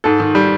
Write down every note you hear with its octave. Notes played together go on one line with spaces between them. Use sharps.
G#2 A4
D#3
G3